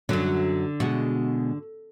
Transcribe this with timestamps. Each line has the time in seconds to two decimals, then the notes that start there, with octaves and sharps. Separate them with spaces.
0.09 F#2 D3 F#3
0.80 B2 G#3 F#4